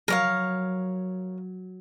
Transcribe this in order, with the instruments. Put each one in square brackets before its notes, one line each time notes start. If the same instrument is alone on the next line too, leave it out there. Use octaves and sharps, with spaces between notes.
[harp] F#3 [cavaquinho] A#4 C#5 F5